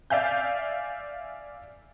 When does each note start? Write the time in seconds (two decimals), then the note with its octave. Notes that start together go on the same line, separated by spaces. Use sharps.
0.10 D5 E5 F5 G#5 G6